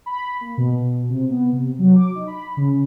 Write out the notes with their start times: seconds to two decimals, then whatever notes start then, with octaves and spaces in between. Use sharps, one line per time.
0.06 B5
0.41 A#3
0.57 B2
1.09 C3
1.30 B3
1.52 C3
1.79 F#3
1.95 D6
2.15 D#4
2.27 B5
2.57 C#3